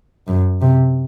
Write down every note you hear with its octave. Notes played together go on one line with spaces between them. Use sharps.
F#2
C3